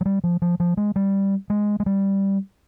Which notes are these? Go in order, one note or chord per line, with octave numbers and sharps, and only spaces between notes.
F#3
G3
F3
F3
F3
G#3
G3
G#3
G#3
G3